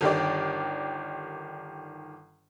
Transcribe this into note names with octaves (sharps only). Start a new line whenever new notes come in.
G1 D#3 G4 D5